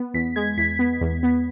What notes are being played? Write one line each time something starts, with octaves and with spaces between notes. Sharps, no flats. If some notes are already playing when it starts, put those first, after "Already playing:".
Already playing: B3
E2 B6
G#3 G#6
E2 B6
B3
E2
B3